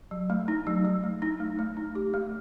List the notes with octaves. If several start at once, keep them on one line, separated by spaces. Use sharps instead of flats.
F#3
A3
D#4
F#3
F#3
A3
D#4
A3
A3
D#4
G4
A3